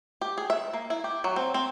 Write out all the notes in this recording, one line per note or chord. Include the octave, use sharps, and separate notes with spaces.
G4
G#4
E5
A#3
E4
G4
F#3
C4
C4